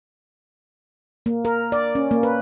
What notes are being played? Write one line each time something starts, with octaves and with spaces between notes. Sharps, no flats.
A#3
A#4
D5
C#4
A#3
B4